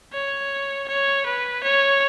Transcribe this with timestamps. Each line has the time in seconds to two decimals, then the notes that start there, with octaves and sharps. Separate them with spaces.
0.13 C#5
0.88 C#5
1.26 B4
1.63 C#5